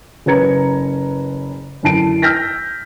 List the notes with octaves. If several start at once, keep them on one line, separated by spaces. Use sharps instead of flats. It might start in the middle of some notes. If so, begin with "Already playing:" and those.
F#1 C#4 B4 A#5 G#6 C#7
F#2 D3 E4 A5 C7 D7
E6 F6 G6 A#6 B6